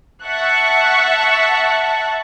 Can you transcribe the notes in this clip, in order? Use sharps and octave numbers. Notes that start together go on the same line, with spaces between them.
E5 F#5 A5 C#6 F#6